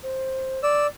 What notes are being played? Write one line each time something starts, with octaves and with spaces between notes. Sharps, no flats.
C5
D5 E6